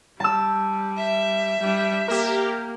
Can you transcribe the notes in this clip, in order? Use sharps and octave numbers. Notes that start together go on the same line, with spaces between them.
G3 A5 E6
E5
G3 D4
A#3 G4 A#4